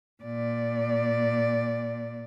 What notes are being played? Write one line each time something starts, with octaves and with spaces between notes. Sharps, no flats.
A#2 D5